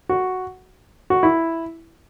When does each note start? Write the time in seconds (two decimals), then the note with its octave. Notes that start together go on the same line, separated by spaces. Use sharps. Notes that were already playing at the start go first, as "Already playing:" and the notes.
0.09 F#4
1.10 F#4
1.23 E4